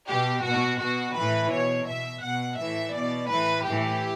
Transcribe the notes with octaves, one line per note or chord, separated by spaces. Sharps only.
B2 G4
B2 F#4
B2 F#4
A2 E3 B4
B2 C#5
B2 E5
B2 F#5
A2 E3 E5
B2 D5
A2 E3 B4
A2 E3 G4